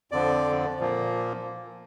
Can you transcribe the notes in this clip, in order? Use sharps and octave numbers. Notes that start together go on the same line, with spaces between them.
F2 D3 F3 D5
A#2 F3 A#3